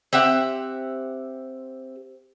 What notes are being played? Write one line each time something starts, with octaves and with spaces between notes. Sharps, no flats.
C4 G4 E5 F#5